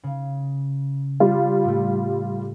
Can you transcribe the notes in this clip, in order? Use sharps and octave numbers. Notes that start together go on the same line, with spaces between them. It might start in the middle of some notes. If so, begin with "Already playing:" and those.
C#3
G3 F4
A2 A3